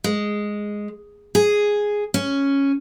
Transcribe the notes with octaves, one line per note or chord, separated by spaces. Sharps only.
G#3
G#4
C#4